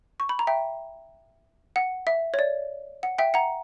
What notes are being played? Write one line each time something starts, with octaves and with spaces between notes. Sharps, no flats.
C#6
B5
A#5
E5 G5
F#5
E5
C#5
D5
F#5
E5 G5
F#5 A#5